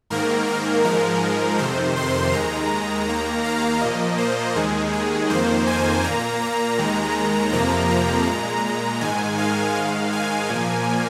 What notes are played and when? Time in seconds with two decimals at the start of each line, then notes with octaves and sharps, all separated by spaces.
0.10 G#2 D#3 A#3 A#4
0.48 A#4
0.84 G#2 F3 G#3 A#4
1.59 F2 C3 D#3 C5
1.96 C6
2.33 D#2 D#3 G#3 A#5
3.08 D#2 D#3 A#3
3.44 F5
3.81 A#2 F3 A#3 D#5
4.18 C5
4.56 D#2 D#3 G#3 G#4
4.93 G#4
5.30 F2 D#3 A#3 C5
5.67 G#5
6.04 A#2 A#3 A#5
6.41 A#5
6.78 D#2 D#3 G#3
7.52 F2 C3 F3 A#3 A#5
7.90 A#5
8.27 A#2 G#3 A#5
9.01 G#2 D#3 G#3 G#5
9.38 F5
9.75 G#2 D#3 G#3 F5
10.12 G#5
10.49 A#2 F3 A#3